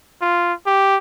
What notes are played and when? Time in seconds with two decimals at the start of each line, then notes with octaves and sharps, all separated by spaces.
0.21 F4
0.66 G4